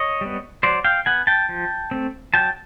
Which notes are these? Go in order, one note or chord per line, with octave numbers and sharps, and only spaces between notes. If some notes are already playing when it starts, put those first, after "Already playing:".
Already playing: C#5 D#5
G3 B3
F#3 C5 D5
F5 G5
B3 F#5 G#5
G5 A5
F3
A3 C4
F#3 G5 A5